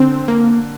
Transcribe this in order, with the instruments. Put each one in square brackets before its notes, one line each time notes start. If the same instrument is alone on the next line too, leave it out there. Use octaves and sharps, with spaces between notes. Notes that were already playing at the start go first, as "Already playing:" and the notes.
Already playing: [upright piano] D3 [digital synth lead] C4
[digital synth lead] A#3